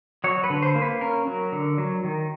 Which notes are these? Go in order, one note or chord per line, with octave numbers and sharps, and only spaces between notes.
F#3 C#5
B4
D3
C5
A#3
B4
C#4 A#4
F#3
D3
F#3
D#3